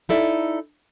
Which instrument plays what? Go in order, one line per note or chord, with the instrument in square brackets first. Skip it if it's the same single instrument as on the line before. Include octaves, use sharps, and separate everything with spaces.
[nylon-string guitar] D#4 E4 A4 D5 E5